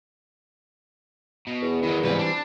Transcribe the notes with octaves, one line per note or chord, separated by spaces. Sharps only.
B2
E2
D#3 F#3 E4
G#2 E3 G3 C4 B4
D4